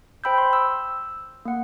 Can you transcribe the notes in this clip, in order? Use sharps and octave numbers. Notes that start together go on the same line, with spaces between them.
C5 G5 B5 E6 G6
C6
E6
A#3 F#5